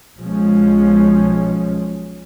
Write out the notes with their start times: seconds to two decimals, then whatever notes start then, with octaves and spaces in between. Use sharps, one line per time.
0.18 B1 F3 G#3 C#4